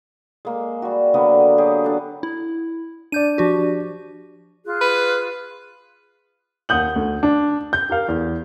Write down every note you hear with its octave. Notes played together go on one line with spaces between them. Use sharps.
G#3 A#3
G3 F#4
D3 F#3 A#3 B3
F#3 G4 G#4
D4 A4
E4
D4 D5 G6 D#7
F3 F#4 G4
F4 G#4 F#6
B4
D#2 F#5 D#6 G6 F#7
D2
D4
G6
G4 A#4 F5
E2